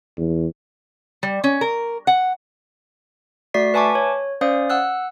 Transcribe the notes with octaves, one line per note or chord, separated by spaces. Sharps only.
E2
G3
C#4
A#4
F#5
A3 F#4 D5 B6 C7
B4 E5 G#5 A5 C#6 D6
C#5
C#4 C5 D5 F5 D#6
F#5 E6 F#6